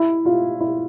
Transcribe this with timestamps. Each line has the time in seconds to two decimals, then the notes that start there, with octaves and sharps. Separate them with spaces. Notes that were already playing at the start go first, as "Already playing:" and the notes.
Already playing: E4
0.26 F4
0.61 E4